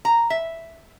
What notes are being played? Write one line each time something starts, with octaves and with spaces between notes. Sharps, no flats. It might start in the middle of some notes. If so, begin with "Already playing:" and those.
A#5
E5